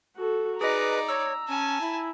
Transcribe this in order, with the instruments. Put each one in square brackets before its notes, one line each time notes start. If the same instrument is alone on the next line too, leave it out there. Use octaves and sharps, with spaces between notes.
[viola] F#4 A4
[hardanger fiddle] D#4 D5 [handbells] G#4 D#5 [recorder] B4 [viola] A#5
[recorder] C#5 [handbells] E6
[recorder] C#4 [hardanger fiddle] G#5 A5
[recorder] E4